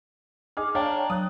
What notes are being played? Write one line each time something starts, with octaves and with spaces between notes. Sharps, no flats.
D#4 G#4 D6 F6
D4 C#5 F5 G5 A#5
F#3 D#6 F#6